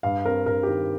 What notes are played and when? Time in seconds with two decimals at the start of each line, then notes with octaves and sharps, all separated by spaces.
0.03 G2 F5
0.25 C4 A#4
0.46 G2 A#4
0.63 G4
0.68 D#3 A#4